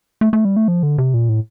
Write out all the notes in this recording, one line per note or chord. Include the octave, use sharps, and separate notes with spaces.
A3
A3
G3
A3
F3
D3
C3
A#2
A2